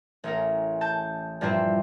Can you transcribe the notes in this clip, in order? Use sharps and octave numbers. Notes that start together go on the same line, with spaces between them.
A1 C#4 A#4
A5 G6
G2 A#2 F3 G3 C4 E4